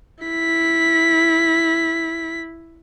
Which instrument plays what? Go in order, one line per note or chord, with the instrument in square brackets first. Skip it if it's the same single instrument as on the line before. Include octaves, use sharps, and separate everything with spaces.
[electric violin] E4 B6